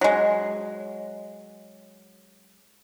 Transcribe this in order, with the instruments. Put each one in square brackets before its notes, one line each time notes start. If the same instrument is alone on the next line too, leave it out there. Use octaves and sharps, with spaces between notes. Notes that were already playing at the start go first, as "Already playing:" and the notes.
[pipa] F#3 G#3